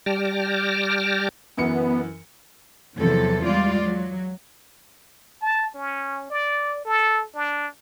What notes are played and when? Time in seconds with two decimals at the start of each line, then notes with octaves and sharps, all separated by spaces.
0.06 G3 G5 A5 D6 F6 A#6
1.57 F#2 E3 B3 C#7
2.97 E2 C3 F3 F#3 A4
3.44 G3 G#3 F4 D5
3.84 F#3
5.42 A5
5.74 C#4
6.30 D5
6.85 A4
7.34 D4